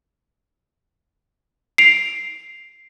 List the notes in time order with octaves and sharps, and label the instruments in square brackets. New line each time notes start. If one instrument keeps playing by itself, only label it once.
[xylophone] C7 D7 F7